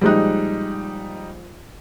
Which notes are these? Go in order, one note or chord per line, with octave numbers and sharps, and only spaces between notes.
A#1 G3 G#3 D#4 F#6